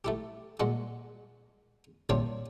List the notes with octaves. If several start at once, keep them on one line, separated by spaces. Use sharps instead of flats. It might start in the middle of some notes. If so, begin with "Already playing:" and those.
A3 E4 G4
A#2 G#3 F#4
C2 A#2 D4 C#5 G5 C6